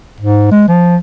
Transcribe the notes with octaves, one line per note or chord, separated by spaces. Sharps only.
G#2
G#3
F3